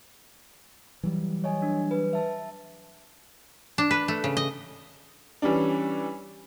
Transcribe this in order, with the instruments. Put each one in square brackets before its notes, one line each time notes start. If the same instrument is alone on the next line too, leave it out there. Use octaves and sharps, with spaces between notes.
[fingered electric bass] E3 F#3 G3
[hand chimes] C#5 D#5 G#5
D4
B4
E5 A5
[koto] D4
B4
A3
C#3
D#5
[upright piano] E3 G3 C#4 D4